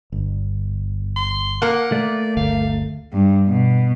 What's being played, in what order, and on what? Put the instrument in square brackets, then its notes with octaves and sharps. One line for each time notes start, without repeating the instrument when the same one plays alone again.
[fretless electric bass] G1
[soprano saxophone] C6
[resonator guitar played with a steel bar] A#3 A#4 [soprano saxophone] F#5
[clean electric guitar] A3 [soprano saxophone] D5
[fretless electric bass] G1 D2 [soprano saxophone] F5
[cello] G2
B2